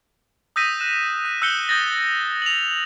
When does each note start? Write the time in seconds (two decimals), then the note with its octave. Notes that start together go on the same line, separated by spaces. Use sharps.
0.56 D#6 E6 G6 A#6 B6 D#7
0.80 F#6 E7
1.25 F#6
1.42 E6 F#6 G6 C#7 G7
1.69 D#6 G6 A6 A#6
2.42 F7 F#7